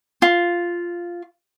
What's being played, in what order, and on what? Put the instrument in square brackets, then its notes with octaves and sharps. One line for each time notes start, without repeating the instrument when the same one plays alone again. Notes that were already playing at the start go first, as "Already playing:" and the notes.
[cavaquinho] F4